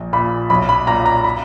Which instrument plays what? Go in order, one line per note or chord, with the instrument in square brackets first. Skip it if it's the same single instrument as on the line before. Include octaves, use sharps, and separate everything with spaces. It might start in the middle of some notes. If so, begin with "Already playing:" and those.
Already playing: [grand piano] A#1
A#2 B5
B1 B5
B5
A#2 A#5
A#5
B5